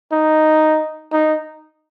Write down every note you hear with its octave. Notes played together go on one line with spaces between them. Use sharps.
D#4
D#4